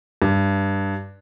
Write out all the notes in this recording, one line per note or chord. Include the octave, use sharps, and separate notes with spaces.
G2